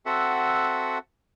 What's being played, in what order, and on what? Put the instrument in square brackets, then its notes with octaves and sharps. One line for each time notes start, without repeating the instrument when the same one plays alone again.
[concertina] C4 F#4 A4 E5 F#5